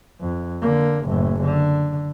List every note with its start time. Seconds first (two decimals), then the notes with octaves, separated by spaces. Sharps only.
0.21 F2
0.62 D3 A#3
1.06 F#1 A2
1.42 D3